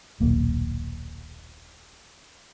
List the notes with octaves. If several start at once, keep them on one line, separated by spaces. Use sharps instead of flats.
D#1 B1 A#3